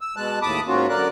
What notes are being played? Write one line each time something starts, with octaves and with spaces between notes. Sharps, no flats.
E6
B2 G#3 A5 F#6
D#2 A2 A5 B5 D6 D#6
G#2 A#3 C#4 F4 F#4
F#2 D3 A#4 D5 F#6